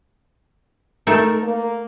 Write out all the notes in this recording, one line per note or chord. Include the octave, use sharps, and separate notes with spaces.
A3 D#4 A4 A#4
A#3